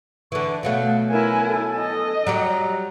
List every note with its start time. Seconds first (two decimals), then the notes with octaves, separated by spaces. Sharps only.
0.32 D3 E3 C#6
0.63 B2 F#3 A3 F5
1.11 E4 A#4 G#5
1.48 A4
1.79 D#5
2.27 F#3 G3 G4 A#5